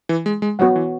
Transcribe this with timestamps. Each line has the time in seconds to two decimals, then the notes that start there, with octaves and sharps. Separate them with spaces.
0.09 E3
0.26 G#3
0.42 G#3
0.59 F#3 B3 F#4 C#5 F#5
0.76 E3